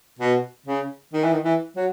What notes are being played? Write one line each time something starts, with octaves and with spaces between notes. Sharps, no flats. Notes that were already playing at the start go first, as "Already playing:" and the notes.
B2
C#3
D#3
E3
D#3
E3
F#3